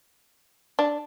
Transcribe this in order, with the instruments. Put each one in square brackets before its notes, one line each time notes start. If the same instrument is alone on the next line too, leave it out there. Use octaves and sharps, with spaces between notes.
[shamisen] D4